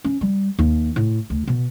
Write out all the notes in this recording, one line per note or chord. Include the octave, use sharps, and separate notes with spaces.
C#4
G3
D#2
A2
D2
B2